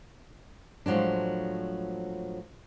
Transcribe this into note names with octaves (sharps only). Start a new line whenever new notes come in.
A2 F3 F#3 G#3 D4